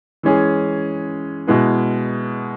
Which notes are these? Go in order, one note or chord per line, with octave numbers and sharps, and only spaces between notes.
E3 G#3 C#4 G#4
B2 G#3 E4 B4